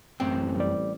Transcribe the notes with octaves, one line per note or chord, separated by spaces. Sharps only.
A1 F#2 A2 C4 G5
G3 D5